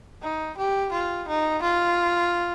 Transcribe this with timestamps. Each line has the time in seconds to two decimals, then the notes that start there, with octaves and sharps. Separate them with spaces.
0.22 D#4
0.57 G4
0.92 F4
1.28 D#4
1.63 F4